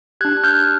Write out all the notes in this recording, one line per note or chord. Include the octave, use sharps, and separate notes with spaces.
D4 G4 F#6 G#6
F#6
F6 G6